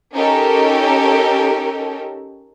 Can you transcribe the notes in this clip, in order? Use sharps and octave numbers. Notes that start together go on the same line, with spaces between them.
C#4 D#4 G4 A4 A#4